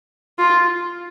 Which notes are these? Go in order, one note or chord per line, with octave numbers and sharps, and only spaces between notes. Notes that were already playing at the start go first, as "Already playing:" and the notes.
F4